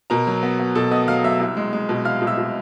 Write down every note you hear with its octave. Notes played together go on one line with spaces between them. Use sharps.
B2 A#4 A#5
F#3
B3
B3
B2 A4 A5
B3 D#5 D#6
F#3 F5 F6
F#3 E5 E6
C2
G#3
G#3
B2
C2 F5 F6
B2
E5 E6
B2